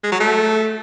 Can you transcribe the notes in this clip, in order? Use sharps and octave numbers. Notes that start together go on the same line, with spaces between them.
G#3
F#3
A3